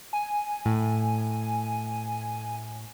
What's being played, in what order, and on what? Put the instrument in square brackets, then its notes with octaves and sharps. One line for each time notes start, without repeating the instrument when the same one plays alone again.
[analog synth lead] G#5
[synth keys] A2